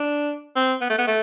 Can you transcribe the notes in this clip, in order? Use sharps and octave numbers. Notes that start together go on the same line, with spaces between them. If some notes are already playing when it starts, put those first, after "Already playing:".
Already playing: D4
C4
B3
A3
B3
A3